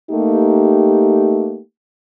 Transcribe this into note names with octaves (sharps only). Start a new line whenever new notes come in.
A3 A#3 D#4 G4